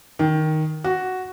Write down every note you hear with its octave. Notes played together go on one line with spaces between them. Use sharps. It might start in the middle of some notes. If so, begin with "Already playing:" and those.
D#3
F#4